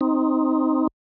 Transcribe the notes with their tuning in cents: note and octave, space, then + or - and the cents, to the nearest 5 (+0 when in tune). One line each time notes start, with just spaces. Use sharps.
C4 +5 D#4 +5